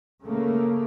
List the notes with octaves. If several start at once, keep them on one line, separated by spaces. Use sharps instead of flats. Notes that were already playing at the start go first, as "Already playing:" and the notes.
C#3 A3 A#3